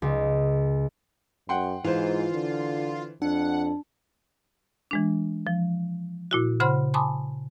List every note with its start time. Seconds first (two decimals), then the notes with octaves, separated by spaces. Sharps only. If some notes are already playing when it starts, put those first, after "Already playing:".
0.02 C#2
1.49 F#2 F#5 G5 C6
1.84 G#2 E3 F4 C5
2.32 D3
3.22 F2 D4 F#5
4.91 E3 G#3 D4
5.47 F3
6.31 A#2 E4 F#4
6.60 C#3 C5 F#5 B5 C6 F6
6.94 G#5 A5 B5 C6 D6 D#6